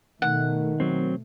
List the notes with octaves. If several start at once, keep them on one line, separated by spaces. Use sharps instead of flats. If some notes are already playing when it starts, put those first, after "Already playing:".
B2 D#3 A3 F#5
F#3 C4